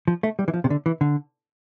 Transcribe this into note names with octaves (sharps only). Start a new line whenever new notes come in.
F3
A3
G3
E3
F3
C3
D3
E3
D3